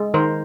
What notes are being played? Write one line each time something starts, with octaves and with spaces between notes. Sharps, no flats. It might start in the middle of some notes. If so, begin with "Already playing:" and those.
Already playing: G#3
D#3 A#4 C5